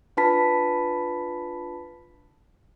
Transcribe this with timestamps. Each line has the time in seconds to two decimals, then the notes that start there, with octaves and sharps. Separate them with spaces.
0.17 D4 F4 B4 A5 B5 B6